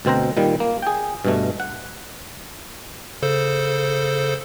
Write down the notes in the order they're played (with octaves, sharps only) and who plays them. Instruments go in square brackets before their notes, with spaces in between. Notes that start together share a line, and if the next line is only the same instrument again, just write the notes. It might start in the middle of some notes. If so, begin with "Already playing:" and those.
[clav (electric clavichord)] D2 B2 C4 C5 A#5
A#2 D#3 G3
A#3
G#4 G5
G2 B2 A3
F#5
[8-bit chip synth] C#3 A4 C5